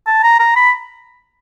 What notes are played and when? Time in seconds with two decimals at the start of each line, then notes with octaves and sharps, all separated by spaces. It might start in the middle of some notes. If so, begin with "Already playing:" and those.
0.06 A5
0.23 A#5
0.39 A#5
0.56 B5